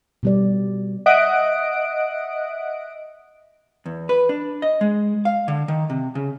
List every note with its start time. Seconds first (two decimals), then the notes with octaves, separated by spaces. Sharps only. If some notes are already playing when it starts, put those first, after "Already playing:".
0.23 B2 G3 D5
1.06 D#5 E5 F#5 D#6 F#6 D7
3.86 E2
4.09 B4
4.29 D4
4.62 D#5
4.81 G#3
5.25 F5
5.48 D3
5.68 D#3
5.90 C3
6.15 C#3